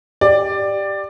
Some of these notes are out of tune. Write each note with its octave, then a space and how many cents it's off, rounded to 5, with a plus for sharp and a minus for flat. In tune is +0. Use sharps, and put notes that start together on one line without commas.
G4 +0 D5 +15